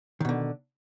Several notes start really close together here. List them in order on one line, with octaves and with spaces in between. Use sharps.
D#3 B2 D3